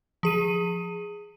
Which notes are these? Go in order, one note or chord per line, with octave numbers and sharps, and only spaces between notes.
F3 G#4 D#7